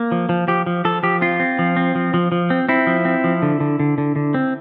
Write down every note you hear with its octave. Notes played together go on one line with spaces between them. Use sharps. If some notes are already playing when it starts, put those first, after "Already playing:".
Already playing: A#3
F3
F3
F3 G4
F3
F3 A4
F3 G4
C4 F4
C4
F3
C4
F3
F3
F3
C4
C4 E4
F3
C4
F3
D3
D3
D3
D3
D3
C4